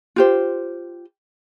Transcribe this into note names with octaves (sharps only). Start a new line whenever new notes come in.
F4 G4 C5